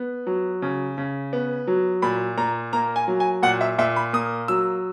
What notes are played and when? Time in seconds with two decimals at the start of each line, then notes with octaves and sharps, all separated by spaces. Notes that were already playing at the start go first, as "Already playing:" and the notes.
Already playing: B3
0.27 F#3
0.62 C#3
0.98 C#3
1.33 B3
1.67 F#3
2.02 A#2 B5
2.38 A#2 A#5
2.73 A#3 A#5
2.96 G#5
3.08 F#3
3.20 G#5
3.43 A#2 F#5
3.61 E5
3.79 A#2 E5
3.96 B5
4.13 A#3 D#6
4.48 F#3 E6